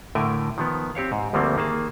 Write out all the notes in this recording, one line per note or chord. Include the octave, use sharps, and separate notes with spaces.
A2 D3 A3 A#4 G5 G#5
D#3 F3 B3
C4 G4 C#5 F5
G#2
D2 F3 G3 A3 A#3 C4
D#3 A#3 G#4 A5